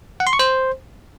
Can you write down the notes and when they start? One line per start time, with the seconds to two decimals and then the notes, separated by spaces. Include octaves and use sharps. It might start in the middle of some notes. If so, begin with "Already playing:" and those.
0.20 F#5
0.27 C6
0.33 C#6
0.39 C5